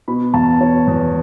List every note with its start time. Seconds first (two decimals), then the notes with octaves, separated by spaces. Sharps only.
0.08 B2 B5
0.34 E2 A5
0.60 B2 C#5
0.87 E2